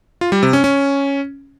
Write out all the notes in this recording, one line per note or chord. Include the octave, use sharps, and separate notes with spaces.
F4
G3
C3
C#4
C#4